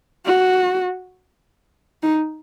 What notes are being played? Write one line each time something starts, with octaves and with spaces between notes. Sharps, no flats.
F#4
D#4